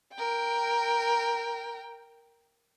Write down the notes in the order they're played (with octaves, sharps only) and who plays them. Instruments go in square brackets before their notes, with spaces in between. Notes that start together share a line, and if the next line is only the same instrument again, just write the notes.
[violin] A#4 G5